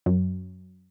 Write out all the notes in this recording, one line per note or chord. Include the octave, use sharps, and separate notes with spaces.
F#2